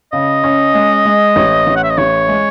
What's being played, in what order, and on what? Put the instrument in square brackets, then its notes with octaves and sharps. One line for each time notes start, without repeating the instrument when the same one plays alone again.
[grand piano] C#3 [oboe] D#5
[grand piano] C#4
G#3
G#3
A1
A1
[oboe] F#5
E5
D#5
[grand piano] A1 [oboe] C#5
[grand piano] G#3